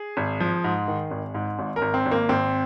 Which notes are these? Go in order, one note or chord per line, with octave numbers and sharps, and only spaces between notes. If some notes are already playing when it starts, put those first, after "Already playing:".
Already playing: G#4
G#1
F3
G#2
D#3
G#1
G#2
G#1
A#4
G#1
C4
G#1
A#3
G#1 C4